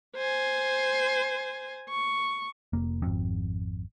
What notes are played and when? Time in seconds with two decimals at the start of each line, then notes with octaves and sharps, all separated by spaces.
0.16 C5 G#5
1.90 C#6
2.73 F1 A#3
3.02 G#1 F2